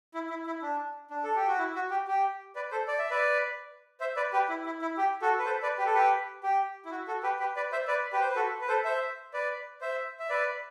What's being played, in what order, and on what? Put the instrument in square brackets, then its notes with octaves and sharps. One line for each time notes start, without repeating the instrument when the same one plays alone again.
[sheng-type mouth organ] E4
E4
E4
D4
D4
A4
G4
F#4
E4
F#4
G4
G4
B4 D5
A4 C5
D5
E5
B4 D5
C5 E5
B4 D5
G4 B4
E4
E4
E4
G4
F#4 A4
B4
A4 C5
B4 D5
G4 B4
A4
G4 B4
G4
E4
F#4
F#4 A4
G4 B4
G4 B4
B4 D5
C5 E5
B4 D5
G4 B4
C5
B4
F#4 A4
B4
A4 C5
C5 E5
B4 D5
C5 E5
E5
B4 D5